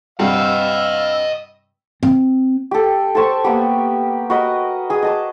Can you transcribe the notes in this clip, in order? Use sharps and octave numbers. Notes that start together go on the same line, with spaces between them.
G2 C3 D#5 F5 F#5 E6
C4
G4 A4
A4 C5 A5 C#6
A#3 B3 G4
F#4 A#4 B4 D#5
G#4 D#6
D#5 A5 D6